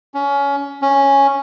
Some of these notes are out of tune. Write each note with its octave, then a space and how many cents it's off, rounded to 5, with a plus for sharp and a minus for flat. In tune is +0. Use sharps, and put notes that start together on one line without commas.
C#4 +20
C#4 -5